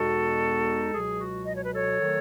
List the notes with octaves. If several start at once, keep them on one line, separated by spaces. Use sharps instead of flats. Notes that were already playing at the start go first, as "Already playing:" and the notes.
Already playing: E2 B2 G#3 B3 D#4 F#4 A4
C#2 B2 F#3 G#4
F#4
D#5
C#5
B4
A4 C#5
D#3 F#3 A3